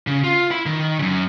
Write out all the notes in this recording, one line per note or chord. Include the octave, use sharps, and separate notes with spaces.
C#3
F4
E4 B5
D#3
F#2 C#3